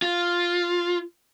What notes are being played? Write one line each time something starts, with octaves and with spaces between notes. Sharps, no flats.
F4